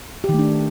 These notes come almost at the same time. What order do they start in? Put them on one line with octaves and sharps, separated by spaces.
G4 D#3 A3 D4